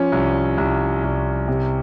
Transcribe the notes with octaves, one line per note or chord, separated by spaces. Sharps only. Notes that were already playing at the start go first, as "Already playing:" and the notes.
Already playing: F3 C#4
C2
C2
C2
C3